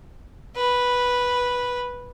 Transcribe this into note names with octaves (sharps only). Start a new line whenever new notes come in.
B4